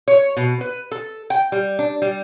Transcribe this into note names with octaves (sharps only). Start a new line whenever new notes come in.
C#5
B2
B4
A4
G5
G3
D4
G3